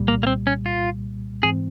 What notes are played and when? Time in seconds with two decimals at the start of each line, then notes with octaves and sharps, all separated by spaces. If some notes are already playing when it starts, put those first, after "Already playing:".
Already playing: C2 A#2 G3
0.08 A#3
0.23 A#3
0.27 C4
0.47 C#4
0.66 F4
1.43 G#2 E3 G#3 C4 G#4